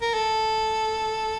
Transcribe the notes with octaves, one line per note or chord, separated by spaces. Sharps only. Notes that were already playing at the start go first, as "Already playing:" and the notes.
A#4
A4